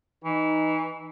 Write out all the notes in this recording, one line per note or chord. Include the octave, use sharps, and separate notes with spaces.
E3 D#4